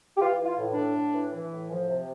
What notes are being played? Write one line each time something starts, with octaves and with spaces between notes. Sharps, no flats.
G4
E3 F4
E3
F4
A2
D4
A2
A2
E3
E3
A2
F3
C3